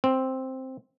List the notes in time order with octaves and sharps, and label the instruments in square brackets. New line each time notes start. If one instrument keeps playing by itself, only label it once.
[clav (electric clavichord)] C4